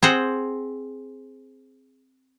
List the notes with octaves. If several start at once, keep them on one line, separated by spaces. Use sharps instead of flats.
C4 G#4 C5 F#5